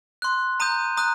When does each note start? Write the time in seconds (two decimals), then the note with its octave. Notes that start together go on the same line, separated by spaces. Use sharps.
0.22 C6 F#6
0.60 A#5 D#6 G6 D#7
0.97 A#5 D#6 F#6